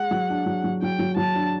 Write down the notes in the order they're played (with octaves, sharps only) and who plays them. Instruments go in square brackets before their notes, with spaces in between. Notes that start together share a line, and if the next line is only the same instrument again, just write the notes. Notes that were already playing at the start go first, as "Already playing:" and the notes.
Already playing: [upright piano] G#3 [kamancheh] F#5
[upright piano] F#3
D4
F#3
F#3
[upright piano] F#3 [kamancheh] G5
[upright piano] F#3
[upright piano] F#3 [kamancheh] A5
[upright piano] D4